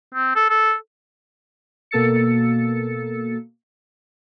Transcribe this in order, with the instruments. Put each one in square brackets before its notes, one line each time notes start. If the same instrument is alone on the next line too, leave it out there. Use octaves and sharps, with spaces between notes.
[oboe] C4
A4
A4
[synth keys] B2 A#3 A4 E6 A6 C#7